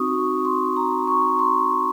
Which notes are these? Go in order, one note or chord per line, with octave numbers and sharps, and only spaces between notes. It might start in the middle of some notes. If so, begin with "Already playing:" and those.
Already playing: C4 D#4 F#4 C#6 D#6
C#6
C6
A#5
C#6
C6